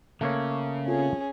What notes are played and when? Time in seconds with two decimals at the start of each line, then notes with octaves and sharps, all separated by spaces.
0.21 C#3 A3 A#3 C#5
0.87 C4 C#4 F4 G#4 A4